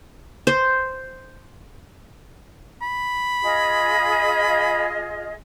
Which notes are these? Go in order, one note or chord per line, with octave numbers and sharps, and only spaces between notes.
C5
B5
F4 G#4 D#5